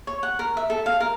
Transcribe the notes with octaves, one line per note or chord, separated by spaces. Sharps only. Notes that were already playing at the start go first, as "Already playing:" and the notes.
C#5
F#5
A#4
E5
A4
F5
A#4